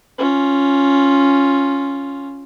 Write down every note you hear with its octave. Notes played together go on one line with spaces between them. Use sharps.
C#4 F4